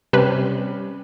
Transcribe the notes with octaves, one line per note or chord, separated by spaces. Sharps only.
C3 G3 C#4 B4